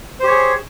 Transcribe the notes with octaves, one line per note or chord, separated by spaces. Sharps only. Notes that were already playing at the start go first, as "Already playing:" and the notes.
G4 G#4 C5 C#5